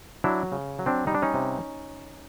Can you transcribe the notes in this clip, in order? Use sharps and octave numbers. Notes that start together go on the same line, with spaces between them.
F#3 D4 E4
C#3
F#3
C4 D4
G3 D#4
D4
C#4 D#4
C3